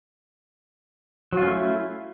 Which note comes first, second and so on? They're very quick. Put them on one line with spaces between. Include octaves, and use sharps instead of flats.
F#3 F4 C#4 A3 E4